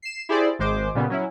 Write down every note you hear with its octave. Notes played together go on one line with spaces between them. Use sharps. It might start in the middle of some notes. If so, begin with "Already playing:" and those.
C7 E7
E4 G4 G#4 C5 D5
G#1 G#3 C5 D6
A#2 C#3 G3 B3
F#3 C#4 E4